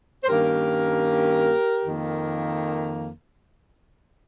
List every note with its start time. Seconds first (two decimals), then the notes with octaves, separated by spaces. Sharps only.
0.24 C5
0.27 G2 D#3 A#3 C#4 G4 A#4
1.84 F2 D#3 A#3